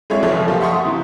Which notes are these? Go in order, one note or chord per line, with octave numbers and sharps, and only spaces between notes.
G#3 C4 E4 G#4 C#5 D5
F1 E3 F3 C#5 E5
F3 A#3 G4 A4 F5
E5 F#5 C6 C#6 D#6
C3 E3